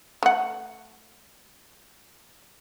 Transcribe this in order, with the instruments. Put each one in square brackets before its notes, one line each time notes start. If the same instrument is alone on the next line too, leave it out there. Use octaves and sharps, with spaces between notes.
[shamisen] A3 F#5